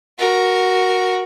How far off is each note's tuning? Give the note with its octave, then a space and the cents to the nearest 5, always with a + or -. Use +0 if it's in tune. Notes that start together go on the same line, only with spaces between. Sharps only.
F#4 +0 A#4 +10